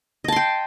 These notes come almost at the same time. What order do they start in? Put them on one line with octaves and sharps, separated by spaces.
D#5 A5 C6 G5